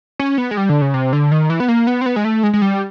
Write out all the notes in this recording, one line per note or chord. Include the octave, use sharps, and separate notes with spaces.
C#4
B3
G#3
G3
D3
C#3
C3
D3
D#3
E3
B3
A#3
B3
C4
B3
G#3
A3
G#3
G#3
G3